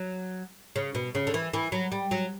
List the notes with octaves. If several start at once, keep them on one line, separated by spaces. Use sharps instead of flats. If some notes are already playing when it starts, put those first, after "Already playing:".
Already playing: F#3
C#3
B2
C#3
D3
E3
E3
F#3
G3
F#3